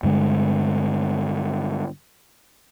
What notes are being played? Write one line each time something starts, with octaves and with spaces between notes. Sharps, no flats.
G2 D3 G#3